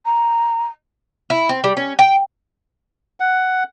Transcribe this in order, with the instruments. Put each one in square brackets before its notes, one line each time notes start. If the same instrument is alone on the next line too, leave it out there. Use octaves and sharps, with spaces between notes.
[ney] A#5
[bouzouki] E4
C4
G3
C#4
G5
[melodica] F#5